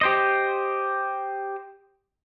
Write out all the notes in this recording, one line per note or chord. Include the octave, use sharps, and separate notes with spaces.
G4 C5 D#5